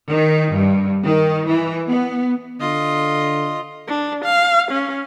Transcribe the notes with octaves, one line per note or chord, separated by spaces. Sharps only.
D#3
G2
D#3
E3
B3
D3 F4 D#5
D4
F5
C#4